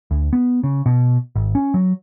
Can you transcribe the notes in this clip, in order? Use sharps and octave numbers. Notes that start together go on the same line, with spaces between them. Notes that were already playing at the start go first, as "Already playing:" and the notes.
D2
B3
C#3
B2
G#1
C#4
F#3